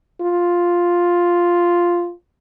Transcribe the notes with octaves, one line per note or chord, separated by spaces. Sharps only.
F4